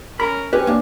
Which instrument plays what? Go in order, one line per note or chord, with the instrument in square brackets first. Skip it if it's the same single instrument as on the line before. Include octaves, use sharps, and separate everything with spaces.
[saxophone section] C#4 A#4 [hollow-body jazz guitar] B5
[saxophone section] C4 C#4 [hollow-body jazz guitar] G4 B4
[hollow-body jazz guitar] A#3 D4